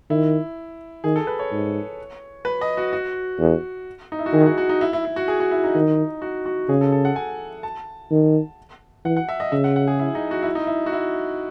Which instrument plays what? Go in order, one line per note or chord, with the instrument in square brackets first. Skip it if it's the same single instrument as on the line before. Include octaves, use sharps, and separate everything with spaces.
[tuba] D#3 [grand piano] E4
[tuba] D#3 [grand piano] G#4
[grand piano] A4
B4
C#5
[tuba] G#2
[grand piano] B4
D#5
F#4
F#4
[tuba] E2
[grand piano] D#4
E4
F#4
[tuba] D#3 [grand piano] G#4
[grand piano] F#4
F#4
D#4
E4
E4
E4
F#4
G#4
F#4
E4
D#4
[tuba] D#3
[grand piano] F#4
F#4
[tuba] C#3 [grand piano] G#4
[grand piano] A4
A4
F#5
G#5
A5
[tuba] D#3
[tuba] E3 [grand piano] F#5
[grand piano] F#5
E5
D#5
[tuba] C#3 [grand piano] E5
[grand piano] F#5
F#5
G#4
E4
D#4
F#4
E4
D#4
E4
F#4
E4